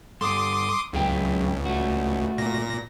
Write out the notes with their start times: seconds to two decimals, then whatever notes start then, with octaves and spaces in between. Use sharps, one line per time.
0.21 G2 A4 C6 D6 D#6
0.93 C#2 F#2 G#4 G5
1.66 A3 F#4
2.38 A#2 A#6